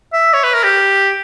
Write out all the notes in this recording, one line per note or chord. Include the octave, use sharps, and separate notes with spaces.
E5
C#5
B4
A#4
G4